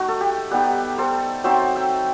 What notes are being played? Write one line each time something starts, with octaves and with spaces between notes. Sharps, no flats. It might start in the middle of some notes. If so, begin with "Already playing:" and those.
Already playing: A3 D#4 F#4
A4
G4
G3 B3 D#4 G4 B4
A4 C5
F#3 C4 D#4 C5 E5
E5 G5